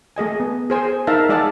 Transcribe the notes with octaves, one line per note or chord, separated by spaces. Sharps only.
A3 G#4 D#5 G#5
B3
G#4 C5 G#5
D#4 A#4 E5 F5 A5
G#3 G#4 D5 E5 F#5 A5